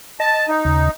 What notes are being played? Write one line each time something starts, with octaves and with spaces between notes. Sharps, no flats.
D#5 A5
D#4
D#2 C#3